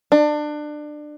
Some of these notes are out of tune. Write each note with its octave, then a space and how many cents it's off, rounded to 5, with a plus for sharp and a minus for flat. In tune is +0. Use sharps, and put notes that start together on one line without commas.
D4 +25